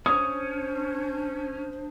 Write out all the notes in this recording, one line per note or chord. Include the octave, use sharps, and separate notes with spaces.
C#4 D4 C5 D#6